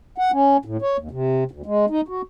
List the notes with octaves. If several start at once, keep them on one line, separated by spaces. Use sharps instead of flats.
F#5
C#4
A2
C#5
D#2
C3
D2
G#3
D#4
F#4